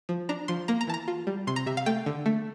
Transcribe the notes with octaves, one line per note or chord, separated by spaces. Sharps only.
F3
D4 A#5
F3 C6
A#3 A#5
A#5
E3 A5
A#5
F4
G3
C3 C6
A#5
C3 E5
F5
A3 G5
D3
A3